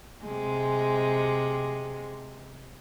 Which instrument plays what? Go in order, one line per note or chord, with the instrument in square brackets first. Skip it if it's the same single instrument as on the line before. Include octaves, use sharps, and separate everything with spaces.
[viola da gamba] C3 G#3